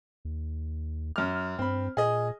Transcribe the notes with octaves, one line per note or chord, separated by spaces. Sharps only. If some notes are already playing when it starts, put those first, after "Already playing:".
D#2
F#2 F6
G2 C4 B5
A#2 G#4 D#5